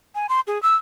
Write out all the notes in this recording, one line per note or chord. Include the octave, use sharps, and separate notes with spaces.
G#5
C6
G#4
E6